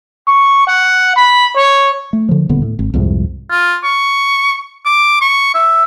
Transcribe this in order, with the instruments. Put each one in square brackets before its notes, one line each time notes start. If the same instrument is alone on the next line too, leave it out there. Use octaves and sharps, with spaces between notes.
[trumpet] C#6
F#5
B5
C#5
[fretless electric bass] A3
D3 F3
D#1 D2 D3 B3
A2
G#1
C2 F2 G#2 C3
[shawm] F4
C#6
D6
C#6
E5